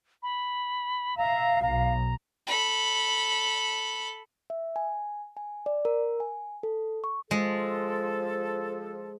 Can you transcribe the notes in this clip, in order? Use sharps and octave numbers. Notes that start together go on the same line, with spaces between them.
B5
E5 F5 A#5
B1 A#5
A4 B5
E5
G#5
G#5
D5
A#4
G#5
A4
C#6
F3 G#3 A4